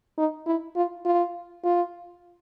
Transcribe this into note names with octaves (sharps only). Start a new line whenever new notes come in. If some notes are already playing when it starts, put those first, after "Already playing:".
D#4
E4
F4
F4
F4